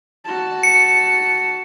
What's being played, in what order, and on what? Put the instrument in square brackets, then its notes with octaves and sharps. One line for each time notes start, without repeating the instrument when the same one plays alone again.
[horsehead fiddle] F#4 A5
[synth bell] C#7